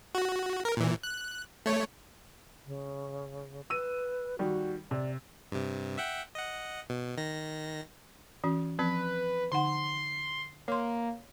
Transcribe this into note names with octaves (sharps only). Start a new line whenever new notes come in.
F#4
A#4
A#2 E3
F#6
A3 C#5
C#3
B4 E6 D#7
D#3 G3 F#4
C3 D5
G2 C3
E5 F#5 G5
D#5 F#5
B2
D#3 A#6
E3 C#4 F#4
F3 C4 B4
D3 D#4 F#5 C6
A#3 C#5 C6